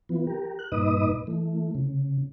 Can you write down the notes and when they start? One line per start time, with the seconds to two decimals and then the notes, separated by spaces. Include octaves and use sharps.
0.09 E3 F3 B3
0.27 G4 A#4
0.59 F#6
0.72 G2 A#2 D#4 B4 D#5 D#6
1.27 E3 A3
1.75 C#3